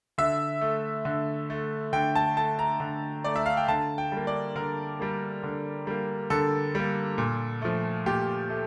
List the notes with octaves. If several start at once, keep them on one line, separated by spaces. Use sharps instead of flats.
D3 E5
A3
D3
A3
D3 G5
A5
A3 A5
A#5
D3
A3 D5
E5
F5
G5
D3 A5
G5
G3 A#3
D5
D3 A#4
G3 A#3
D3
G3 A#3
D3 A4
G3 A#3
A#2
F3 A3
A#2 G4
A3